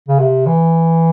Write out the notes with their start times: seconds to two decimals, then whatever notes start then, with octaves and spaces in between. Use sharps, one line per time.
0.09 C#3
0.19 C3
0.47 E3